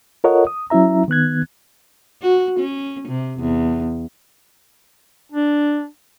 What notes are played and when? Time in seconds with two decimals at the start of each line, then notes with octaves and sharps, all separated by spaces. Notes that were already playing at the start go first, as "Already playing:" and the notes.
0.24 F4 A4 A#4 C#5 D#5 F#5
0.47 D#6
0.70 F#3 C#4 E4 E5 A#5
1.08 D#3 B3 F#6 G#6
2.21 F#4
2.59 C#4
3.08 C3
3.39 E2
5.32 D4